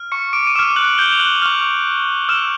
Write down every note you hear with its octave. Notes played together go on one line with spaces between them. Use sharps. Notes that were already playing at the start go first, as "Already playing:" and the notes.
Already playing: F6
C#6 C#7
D6 D7
D#7
D6 E6 F6 E7
F#6 F#7
G6 G7
F7
F#6 F#7
C#6 F6 F7
C#6 E6 F6 E7